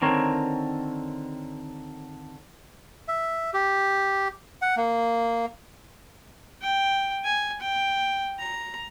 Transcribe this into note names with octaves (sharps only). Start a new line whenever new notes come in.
D3 D#3 C4 A#4 C#5
E5
G4
F#5
A#3
G5
G#5
G5
A#5